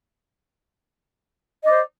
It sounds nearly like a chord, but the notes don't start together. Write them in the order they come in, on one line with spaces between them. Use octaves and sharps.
D#5 D5 C5